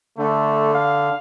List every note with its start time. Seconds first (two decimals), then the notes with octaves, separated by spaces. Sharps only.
0.18 D3 A3
0.74 F5